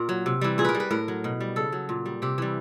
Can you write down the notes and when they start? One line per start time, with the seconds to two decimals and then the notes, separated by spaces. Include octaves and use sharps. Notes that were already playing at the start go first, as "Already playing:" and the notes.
Already playing: A#2 A#4
0.09 F#3
0.26 C3
0.41 E3 G3
0.58 A#2 G#4
0.65 A#4 B4
0.75 G3
0.80 B4
0.91 A2 A#4
1.08 F#3
1.24 B2
1.41 G3
1.56 C#3 A4
1.72 F#3
1.89 A#2
2.06 G3
2.22 C3 G4
2.38 E3 G3